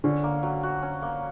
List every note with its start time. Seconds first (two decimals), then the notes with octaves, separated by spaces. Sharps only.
0.04 D3 C#4
0.23 A#3
0.43 F#3
0.63 F#4
0.83 C#4
1.02 A#3